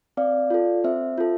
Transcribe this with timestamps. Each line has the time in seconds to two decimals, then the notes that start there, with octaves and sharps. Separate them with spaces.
0.17 C4 D5 F5
0.50 F4 A4
0.84 C4 C5 E5
1.18 F4 A4